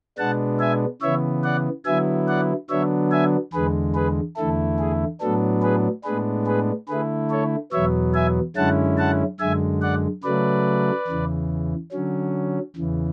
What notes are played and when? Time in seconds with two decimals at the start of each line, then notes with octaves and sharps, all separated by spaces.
0.18 B2 G#3 B3 D4 F#5 A5
0.59 E5 G#5
1.02 C#3 E3 B3 C#5 E5
1.44 D5 F#5
1.85 D3 F#3 B3 E4 E5 G#5
2.28 D5 F#5
2.70 D3 F#3 B3 D4 C#5 E5
3.12 E5 G#5
3.53 E2 D3 G#3 G#4 B4
3.95 G#4 B4
4.37 E2 D3 A3 E4 A4
4.79 G#4
5.21 A2 F#3 B3 D4 A4
5.62 G#4 B4
6.04 A2 G#3 B3 D4 G#4 B4
6.47 G#4 B4
6.88 D3 A3 E4 G#4 B4
7.31 A4 C#5
7.72 E2 B2 F#3 B3 C#5 E5
8.14 E5 G#5
8.56 F#2 D3 G#3 C#4 E4 F#5 A5
8.98 F#5 A5
9.40 F#2 D3 G#3 E5 G#5
9.82 D5 F#5
10.24 C#3 F#3 A3 B4 D5
11.07 E2 C#3 E3
11.92 D3 F#3 C#4
12.76 E2 C#3 E3